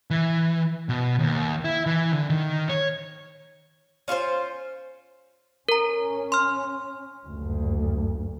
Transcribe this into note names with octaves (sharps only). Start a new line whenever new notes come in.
E3
B2
D#2
E4
E3
D3
D#3
C#5
C#4 F4 A4 C5
C#4 A#4 A#5
C6 F6
F#1 D2 G2